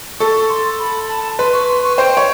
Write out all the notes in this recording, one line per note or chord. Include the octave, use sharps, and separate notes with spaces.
A4 C#6
C6
B5
A5
B4 C6
C#6
C6
C#6
C5 G5
C#5